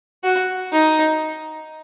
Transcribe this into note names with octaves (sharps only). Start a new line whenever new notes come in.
F#4
D#4